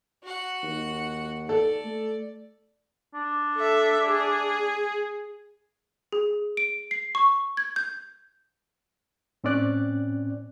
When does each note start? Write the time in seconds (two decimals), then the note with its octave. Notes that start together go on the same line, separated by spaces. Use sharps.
0.24 F#4 F#5
0.63 D#2
1.49 A4 D5
1.84 A3
3.14 D4
3.56 A4 E5
4.06 G#4
6.12 G#4
6.57 D7
6.91 C7
7.15 C#6
7.57 G#6
7.76 G6
9.44 A2 C4 C#4 D5 F#6